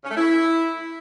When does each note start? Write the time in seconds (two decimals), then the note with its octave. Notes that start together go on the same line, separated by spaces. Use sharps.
0.04 C#4
0.11 A3
0.17 E4